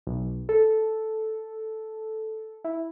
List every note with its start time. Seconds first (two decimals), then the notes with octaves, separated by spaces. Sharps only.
0.07 B1
0.49 A4
2.64 E4